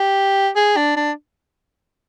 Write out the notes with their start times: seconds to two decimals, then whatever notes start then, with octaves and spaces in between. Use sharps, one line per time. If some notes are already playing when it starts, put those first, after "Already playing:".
Already playing: G4
0.56 G#4
0.77 D4
0.97 D4